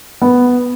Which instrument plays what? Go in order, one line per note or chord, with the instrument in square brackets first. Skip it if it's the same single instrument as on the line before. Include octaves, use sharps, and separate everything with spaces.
[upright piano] B3